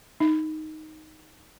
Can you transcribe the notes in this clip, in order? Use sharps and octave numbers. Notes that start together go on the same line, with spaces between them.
D#4